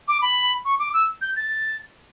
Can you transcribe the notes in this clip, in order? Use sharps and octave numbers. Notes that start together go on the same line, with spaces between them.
D6
B5
C#6
D6
E6
G6
A6